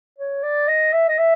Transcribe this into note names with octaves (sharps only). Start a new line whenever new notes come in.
C#5
D5
D#5
E5
D#5
E5